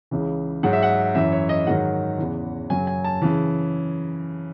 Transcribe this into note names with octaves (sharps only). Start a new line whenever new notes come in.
C#2 C#3 E3
G#2 F#3 F#5
E5
F#5
F#2 E3 E5
C#5
D#5
G#2 D#3 F#3 F#5
E2 C#3 E3
F#2 C#3 F#3 G#5
G#5
A5
C#3 E3